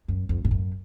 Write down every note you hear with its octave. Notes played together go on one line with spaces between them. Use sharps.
F#2
F2
G#2
F#2